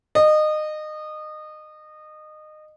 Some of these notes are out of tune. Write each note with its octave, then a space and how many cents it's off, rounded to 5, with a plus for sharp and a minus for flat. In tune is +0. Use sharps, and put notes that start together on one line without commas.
D#5 -25